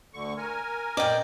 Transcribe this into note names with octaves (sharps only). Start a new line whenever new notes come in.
D2 D3 C#6
A#4 G#5
A#2 D5 D#5 G5